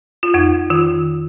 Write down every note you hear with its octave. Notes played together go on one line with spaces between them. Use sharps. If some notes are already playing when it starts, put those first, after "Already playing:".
F4
F2 D#4
D#3 F4